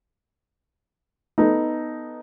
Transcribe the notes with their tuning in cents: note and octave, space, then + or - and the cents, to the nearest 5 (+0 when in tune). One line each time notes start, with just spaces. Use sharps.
B3 +0 D#4 +0 A4 +0